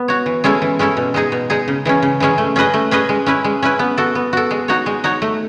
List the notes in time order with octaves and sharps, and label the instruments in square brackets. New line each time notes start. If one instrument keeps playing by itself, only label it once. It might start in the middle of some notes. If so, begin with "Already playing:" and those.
Already playing: [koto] B3
F#4 C#5
E3
G#3 C#4 E4 A4
E3
G#3 C#4 E4 A4
B2
G#3 D#4 G#4
B2
G#3 D#4 G#4
C#3
E3 G#3 C#4
C#3
E3 G#3 C#4
A3
C#4 G#4 B4 D#5
A3
C#4 G#4 B4 D#5
G#3
C#4 E4 B4
G#3
C#4 E4 B4
B3
F#4 A4
B3
F#4 A4
G#3
D#4 F#4 C#5
G#3
D#4 F#4 C#5
A3